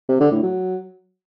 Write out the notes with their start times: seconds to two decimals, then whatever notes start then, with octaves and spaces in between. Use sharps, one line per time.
0.09 C3
0.20 D3
0.31 A2
0.43 F#3